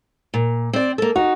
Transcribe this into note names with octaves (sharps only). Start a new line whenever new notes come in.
A#2
C4 D5
A#3 A4
D#4 F#4